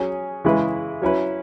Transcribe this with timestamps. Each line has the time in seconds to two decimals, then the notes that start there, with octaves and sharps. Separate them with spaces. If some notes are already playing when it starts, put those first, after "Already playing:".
Already playing: F#3 C#4 G#4
0.45 C#3 E3 G#3 E4 B4
1.02 F#3 C#4 E4 B4